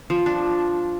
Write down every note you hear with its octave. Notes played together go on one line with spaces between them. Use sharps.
F3
D4